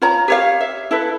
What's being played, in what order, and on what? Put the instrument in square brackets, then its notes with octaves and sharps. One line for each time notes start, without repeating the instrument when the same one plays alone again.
[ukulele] F4 C#5 A#5
G4 C#5 F5
E5
E4 A4 B4